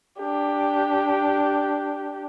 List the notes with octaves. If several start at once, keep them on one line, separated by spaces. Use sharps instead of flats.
D4 G4